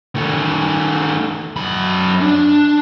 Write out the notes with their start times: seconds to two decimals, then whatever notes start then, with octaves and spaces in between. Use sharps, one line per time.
0.16 D#3 A3
1.56 F#2 B5
2.21 D4